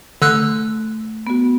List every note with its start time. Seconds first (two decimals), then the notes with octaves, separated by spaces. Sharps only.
0.22 D3 A3 E6 F#6
1.27 B3 F#4